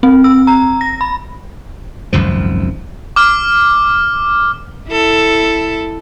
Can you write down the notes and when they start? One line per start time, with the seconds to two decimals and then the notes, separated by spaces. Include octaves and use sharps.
0.03 C4
0.24 E6
0.47 A#5
0.81 A#6
1.01 B5
2.13 G#1 C#2 F#2 F3
3.16 D6 F6
4.89 E4 A4